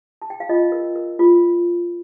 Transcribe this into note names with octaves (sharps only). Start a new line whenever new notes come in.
A5
G5
F5
F4 D#5
A#4
A#4
F4